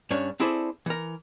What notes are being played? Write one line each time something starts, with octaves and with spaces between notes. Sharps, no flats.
G2 C#4 D4 C#5
C4 E4 G#4 A4 C5 D5
E3 A#4